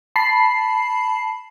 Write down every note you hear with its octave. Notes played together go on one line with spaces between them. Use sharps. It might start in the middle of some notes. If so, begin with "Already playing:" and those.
A5 B5 C7